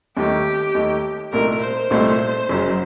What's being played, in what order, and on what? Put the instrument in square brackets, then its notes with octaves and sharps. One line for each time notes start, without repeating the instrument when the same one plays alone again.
[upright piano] D#2 D#3 A3 D#4 [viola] G4
[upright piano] D#2 D#3 A3 D#4
[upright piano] C2 A#2 A3 D#4 [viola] A#4
[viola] C5
[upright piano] C2 A#2 A3 D#4
F#1 F#2 F#3